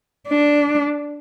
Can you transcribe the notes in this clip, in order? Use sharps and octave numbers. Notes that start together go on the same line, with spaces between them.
D4